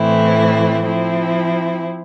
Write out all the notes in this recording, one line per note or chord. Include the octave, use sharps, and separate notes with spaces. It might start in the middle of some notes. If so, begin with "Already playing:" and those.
Already playing: A2 E3 A3 C4 E4
F3 C4 E4